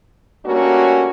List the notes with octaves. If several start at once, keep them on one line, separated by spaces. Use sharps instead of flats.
G3 A3 A#3 C#4 D4 F#4